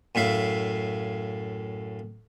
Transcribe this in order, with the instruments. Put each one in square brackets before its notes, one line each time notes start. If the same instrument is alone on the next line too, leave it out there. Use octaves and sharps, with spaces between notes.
[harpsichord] F#2 A2 E5 F5